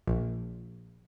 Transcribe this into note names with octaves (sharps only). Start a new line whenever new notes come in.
A#1